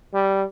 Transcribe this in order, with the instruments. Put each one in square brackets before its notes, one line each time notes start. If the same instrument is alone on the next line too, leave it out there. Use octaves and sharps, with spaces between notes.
[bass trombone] G3